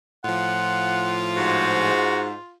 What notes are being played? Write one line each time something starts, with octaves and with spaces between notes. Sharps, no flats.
A2 F3 F4 F#5
G#2 F#4